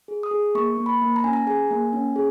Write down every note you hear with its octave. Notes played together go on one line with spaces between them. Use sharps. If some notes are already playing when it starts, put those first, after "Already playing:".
G#4
D#6
G#4
A#3 C#6
A#3
B5
A#3
A#5
C#4 G#5
A#5
G#4 G#5
A#3
C#4
G#4